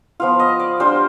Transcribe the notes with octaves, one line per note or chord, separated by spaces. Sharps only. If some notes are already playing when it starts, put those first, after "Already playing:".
F3 B3 F4 F5
D#5
D5
G3 D4 F4 C5